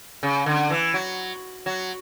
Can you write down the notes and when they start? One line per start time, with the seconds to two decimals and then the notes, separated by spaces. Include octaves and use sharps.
0.23 C#3
0.46 D3
0.70 E3
0.94 F#3
1.66 F#3